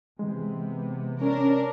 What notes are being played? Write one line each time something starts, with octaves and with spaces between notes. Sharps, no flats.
C3 E3 G#3 B3
C#4 D4 A#4